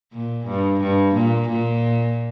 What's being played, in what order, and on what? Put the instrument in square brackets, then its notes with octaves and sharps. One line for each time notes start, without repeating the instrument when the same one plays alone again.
[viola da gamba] A#2
G2
G2
A#2
A#2